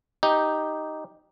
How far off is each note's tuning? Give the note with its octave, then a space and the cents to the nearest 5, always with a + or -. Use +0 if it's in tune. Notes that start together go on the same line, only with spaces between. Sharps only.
D#4 +0 G4 +0